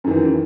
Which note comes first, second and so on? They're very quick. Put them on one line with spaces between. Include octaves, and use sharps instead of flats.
F#2 D#3 E3